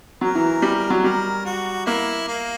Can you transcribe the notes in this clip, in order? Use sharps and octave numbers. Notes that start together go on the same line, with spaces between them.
F#3 A#4
E3
G3
F#3
G3 A#4
F#4
A#3 E4
A#3